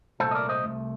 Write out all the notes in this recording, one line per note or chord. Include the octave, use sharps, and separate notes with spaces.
C2 A#2 A3 A4 C5
D#5
A#4 D5
C5 D#5
C2 A#2 A3